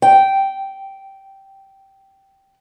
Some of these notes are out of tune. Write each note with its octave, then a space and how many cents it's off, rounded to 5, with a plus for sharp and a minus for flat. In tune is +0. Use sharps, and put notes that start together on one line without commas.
G5 -10